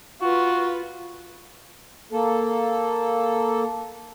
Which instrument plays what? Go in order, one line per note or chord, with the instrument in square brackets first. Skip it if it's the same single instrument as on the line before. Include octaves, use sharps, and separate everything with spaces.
[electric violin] F4 B4 [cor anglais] F#4
[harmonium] A#3 A4